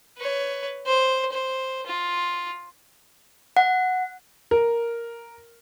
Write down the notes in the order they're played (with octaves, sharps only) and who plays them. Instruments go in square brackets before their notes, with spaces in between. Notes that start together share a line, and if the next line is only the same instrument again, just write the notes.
[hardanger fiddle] B4 C#5
C5
C5
F4
[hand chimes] F#5
[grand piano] A#4